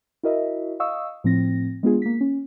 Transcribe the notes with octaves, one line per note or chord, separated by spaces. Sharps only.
E4 F#4 A#4 D#5 E5
D#5 F5 C#6 D#6 E6
A2 F3 C4 A#6
G#3 B3 D4 F4 G#4
A#3 B6
C#4